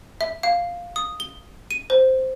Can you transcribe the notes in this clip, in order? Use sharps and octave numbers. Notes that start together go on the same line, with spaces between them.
E5
F5
D#6
G7
D#7
C5